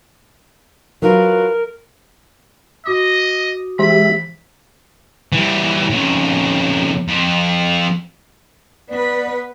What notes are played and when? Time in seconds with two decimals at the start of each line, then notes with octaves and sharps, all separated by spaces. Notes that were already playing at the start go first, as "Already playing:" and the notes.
1.02 F#3 F4 A#4 B4
2.85 F#4 D#5 D6 D#6
3.79 E3 G#3 G4 E5 B5
5.32 E3 G3
5.91 F2 C#3
7.08 F2
8.90 B3 B4 D5